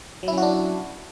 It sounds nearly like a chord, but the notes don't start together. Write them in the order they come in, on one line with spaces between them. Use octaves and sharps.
F#3 E4 C#4 F#4 D4